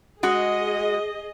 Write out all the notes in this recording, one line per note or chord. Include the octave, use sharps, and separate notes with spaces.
G#3 F#4 G#4 D#5